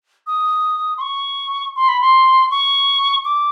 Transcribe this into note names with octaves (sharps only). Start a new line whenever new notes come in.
D#6
C6
C#6
C6
B5
C6
C#6
D6